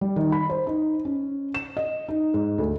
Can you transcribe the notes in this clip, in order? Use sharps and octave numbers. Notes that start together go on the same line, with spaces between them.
G3
D#3
B5
C5
D#4
C#4
E7
D#5
D#4
G#2
D2